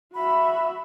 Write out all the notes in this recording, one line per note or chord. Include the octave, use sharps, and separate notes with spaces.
F#4 E5 B5